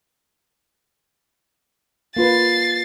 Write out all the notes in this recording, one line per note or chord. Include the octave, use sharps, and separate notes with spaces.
A#3 F4 B4 A6 C7